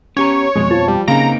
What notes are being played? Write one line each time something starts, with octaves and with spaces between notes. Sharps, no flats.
B3 C#4 G4 C#5 A#5
F2 B2 G#3 G#4
F3 A5
G3
C#3 A#3 C4 D#4 A#5 D7